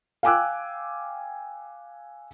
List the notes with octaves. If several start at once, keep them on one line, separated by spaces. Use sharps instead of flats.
F5 G5 G#5 D6 E6 F#6